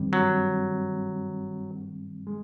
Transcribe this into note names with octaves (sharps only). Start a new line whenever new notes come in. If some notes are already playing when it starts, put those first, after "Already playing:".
Already playing: G2 D#3 G3 C4
F#3
G#3